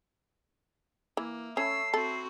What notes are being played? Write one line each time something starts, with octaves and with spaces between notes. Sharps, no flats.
E3 A#3 E5
A3 C#4 C#5 B5 E6 C7
C4 F#4 A4